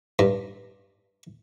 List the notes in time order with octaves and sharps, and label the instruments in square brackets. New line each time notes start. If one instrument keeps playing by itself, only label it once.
[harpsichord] G2